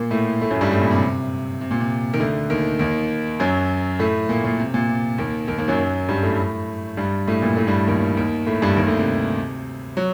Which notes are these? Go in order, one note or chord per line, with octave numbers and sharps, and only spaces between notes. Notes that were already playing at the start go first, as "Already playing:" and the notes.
Already playing: A#2 A#3
A2 A3
A2 A3
F#2 F#3
G2 G3
A2 A3
A#2
C3
C3
A#2
C3
D#3
D2 D3
D#2 D#3
D#2 D#3
F#2 F#3
A2 A3
A#2 A#3
A#2 A#3
C3
A#2
C3
D#2 D#3
D#2 D#3
D#2 D#3
F#2 F#3
G2 G3
A2 A3
G2 G3
A2 A3
A#2 A#3
A2 A3
G2 G3
D#2 D#3
D#2 D#3
A2 A3
G2 G3
D#2 D#3
D2 D3
C3
F#3